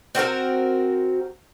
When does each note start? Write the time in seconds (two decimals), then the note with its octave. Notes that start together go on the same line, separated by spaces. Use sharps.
0.15 C4 F#4 A4 A#4